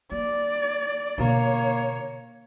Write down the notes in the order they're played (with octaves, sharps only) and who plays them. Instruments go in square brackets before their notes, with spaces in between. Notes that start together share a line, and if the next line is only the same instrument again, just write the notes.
[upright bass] A#3 [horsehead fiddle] D5
[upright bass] B2 D3 [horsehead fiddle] A#3 C#5